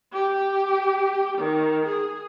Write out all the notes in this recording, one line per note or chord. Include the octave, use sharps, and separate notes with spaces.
G4
D#3
G#4